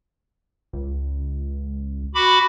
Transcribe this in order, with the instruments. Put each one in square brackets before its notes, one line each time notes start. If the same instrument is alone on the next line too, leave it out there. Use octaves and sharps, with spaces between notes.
[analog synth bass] C#2
[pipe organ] F#4 B5 D6